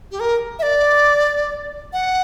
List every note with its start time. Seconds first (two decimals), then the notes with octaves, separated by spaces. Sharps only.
0.11 G4
0.20 A#4
0.59 E5
0.63 D5
1.93 F#5